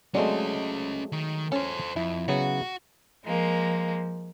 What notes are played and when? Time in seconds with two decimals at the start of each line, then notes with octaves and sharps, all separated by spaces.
0.15 F#3 G#3 A3 C4 C#4 D5 D#5
1.12 D#3
1.52 C#4 A4 C5
1.96 F2 E4
2.28 C#3 F#3 B3 F#4
3.24 F3 G#3 A#3